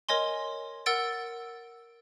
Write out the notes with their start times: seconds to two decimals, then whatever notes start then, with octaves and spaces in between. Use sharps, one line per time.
0.09 A#4 C#5 D#5 G#5 C6
0.86 A#4 F#5 E6 A6 D7